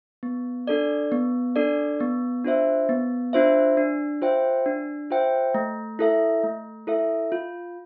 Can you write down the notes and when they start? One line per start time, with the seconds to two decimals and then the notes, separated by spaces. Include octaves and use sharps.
0.23 B3
0.67 D4 A4 D5
1.12 B3
1.56 D4 A4 D5
2.00 B3
2.44 D4 F4 C5 E5
2.89 B3
3.33 D4 F4 C5 E5
3.77 D4
4.22 F4 C5 E5 G5
4.66 D4
5.10 F4 C5 E5 G5
5.55 A3
5.99 E4 A4 E5
6.43 A3
6.87 E4 A4 E5
7.32 F4